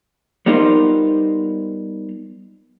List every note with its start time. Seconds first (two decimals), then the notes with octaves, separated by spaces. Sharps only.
0.46 G3 B3 D#4 F4 A#4 C5